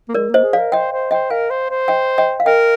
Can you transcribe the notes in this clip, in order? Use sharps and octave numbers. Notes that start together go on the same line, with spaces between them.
A#3
G#3 A#4 D5
A#3
C5 D#5
G#4
D5 F5
A#4
C5 D#5 G5
C5
C5 D#5 G5
A#4 F5 G#5
C5
C5
D#5 G5
D#5 G5
F5
A#4 D#5 G5